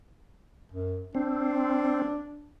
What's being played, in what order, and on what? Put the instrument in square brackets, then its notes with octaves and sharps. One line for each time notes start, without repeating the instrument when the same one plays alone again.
[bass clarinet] F#2
[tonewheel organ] C4 [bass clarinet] D4